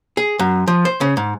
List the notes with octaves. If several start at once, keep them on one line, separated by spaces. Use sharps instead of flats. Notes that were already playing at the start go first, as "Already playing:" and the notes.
G#4
F#2
F3
C5
C#3
G#2